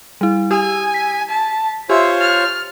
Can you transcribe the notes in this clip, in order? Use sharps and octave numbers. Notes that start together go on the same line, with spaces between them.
G3 E4
G4 G#5 D#6 E6
B6
A5
F4 G4 C5 C#5 E5
F6 A6 F7